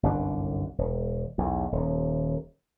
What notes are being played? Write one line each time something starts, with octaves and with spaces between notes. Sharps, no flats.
G1 C2 F#2 D4
E1
B1 E2
D#1 D#2